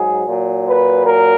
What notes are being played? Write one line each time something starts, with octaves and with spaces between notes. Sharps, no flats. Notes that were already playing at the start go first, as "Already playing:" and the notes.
Already playing: G#2 F#3 G#4
A#2 F#3
B4
A#4